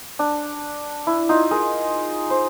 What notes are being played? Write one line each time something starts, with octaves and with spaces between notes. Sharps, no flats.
D4
E4
D#4 F4
G#4 A#4
C5